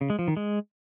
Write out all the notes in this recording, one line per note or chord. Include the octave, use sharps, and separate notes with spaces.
C#3
G#3
F3
D#3
G#3